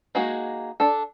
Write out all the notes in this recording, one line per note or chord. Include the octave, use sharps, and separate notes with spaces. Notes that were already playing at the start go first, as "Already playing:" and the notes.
G#3 A#3 D#4 F#4 G#4
D4 A4